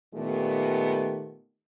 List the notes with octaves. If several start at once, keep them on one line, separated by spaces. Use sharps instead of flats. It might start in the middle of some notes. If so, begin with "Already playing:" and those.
A#2 D#3 A3 B3 G4